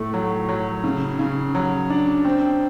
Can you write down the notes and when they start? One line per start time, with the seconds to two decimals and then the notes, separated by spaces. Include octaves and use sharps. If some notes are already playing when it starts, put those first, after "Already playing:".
Already playing: A2 A3
0.14 F#3
0.49 F#3
0.84 C#3
1.19 C#3
1.55 F#3
1.90 D4
2.25 C4